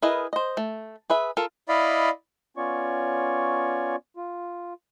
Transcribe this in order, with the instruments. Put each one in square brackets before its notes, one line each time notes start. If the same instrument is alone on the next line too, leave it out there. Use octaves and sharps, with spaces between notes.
[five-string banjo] E4 G#4 A#4 B4 D#5
C5 D#5
A3
G#4 B4 E5
F4 A4 A#4
[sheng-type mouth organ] E4 D5 D#5 F5 B5
[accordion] B3 C#4 F4 C#5 D5 C#6
F4